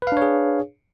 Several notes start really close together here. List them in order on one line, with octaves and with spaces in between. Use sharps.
B4 F5 D4 C#5 G#4